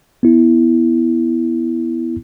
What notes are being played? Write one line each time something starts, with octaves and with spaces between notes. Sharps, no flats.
B3 E4